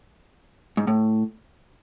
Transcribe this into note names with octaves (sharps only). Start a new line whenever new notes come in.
G#2
A2